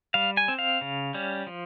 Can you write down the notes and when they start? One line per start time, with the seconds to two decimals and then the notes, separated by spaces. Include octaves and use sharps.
0.14 G3 F5
0.37 G#5
0.48 C4
0.59 F5
0.81 C#3
1.14 G3 C#4
1.47 F3